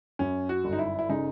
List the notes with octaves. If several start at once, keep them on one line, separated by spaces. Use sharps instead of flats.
F#2 C#4
F#4
G1
D#4
E4
E4
C#3 D#4